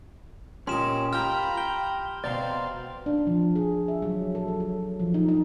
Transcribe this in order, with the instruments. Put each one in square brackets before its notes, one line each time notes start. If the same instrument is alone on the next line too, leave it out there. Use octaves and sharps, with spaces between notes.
[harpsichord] A#2 D#5 [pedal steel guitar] C#4 G4 A#4 [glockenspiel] C6 E7
[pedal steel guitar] F4 G5 [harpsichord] G4 [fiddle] A#5 B5 [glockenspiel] F6
[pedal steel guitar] G5 [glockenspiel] G7
[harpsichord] B2 [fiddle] C4 F5 [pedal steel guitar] D5 A#5 C6
[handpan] D4
F3
G#4
E5
F#3
A4
F#3
F#3
F3
D#4
D#4